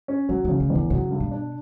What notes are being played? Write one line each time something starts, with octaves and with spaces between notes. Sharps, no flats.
C#4
D3 F#3
C#3 E3
D3
E2
D3
C#3 F#3
G2
B2
D4